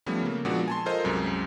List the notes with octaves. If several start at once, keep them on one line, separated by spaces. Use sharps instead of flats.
F3 G3 A3 B3 C#4
C#3 A#3
A#2 F3 G#3 B3 D4 F#4
G#5 A5 C6
F4 A4 A#4 C5 D#5
C2 F#2 C3 G#3